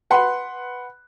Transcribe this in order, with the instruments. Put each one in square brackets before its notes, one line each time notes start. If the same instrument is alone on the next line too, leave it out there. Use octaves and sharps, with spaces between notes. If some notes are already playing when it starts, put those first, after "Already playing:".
[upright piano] B4 F#5 B5 C6